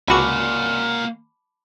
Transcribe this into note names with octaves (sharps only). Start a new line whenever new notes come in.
C#2 A#3 F#4 G#5 A5 B5 D6 F6